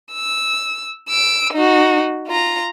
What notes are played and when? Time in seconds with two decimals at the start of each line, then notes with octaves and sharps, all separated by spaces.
0.13 E6
1.09 E6 D7
1.53 D#4 F#4
2.27 F4 A#5